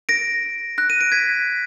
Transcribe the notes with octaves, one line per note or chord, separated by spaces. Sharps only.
A#6 D7
F#6 A#6
D#7
A#6 D7
G#6 B6